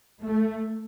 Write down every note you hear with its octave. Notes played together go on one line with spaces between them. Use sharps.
A3